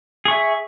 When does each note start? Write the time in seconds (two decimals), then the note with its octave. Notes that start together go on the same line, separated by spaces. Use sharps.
0.25 G#4
0.28 C#6
0.31 E5